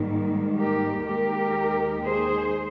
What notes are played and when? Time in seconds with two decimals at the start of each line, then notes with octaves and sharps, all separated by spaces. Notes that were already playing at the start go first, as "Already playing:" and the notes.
Already playing: G#2 D#3 G3 A#3
0.58 G4 A#4
1.07 D#2 D#3 G#3 D#4 G4 A#4
2.04 G#4 C5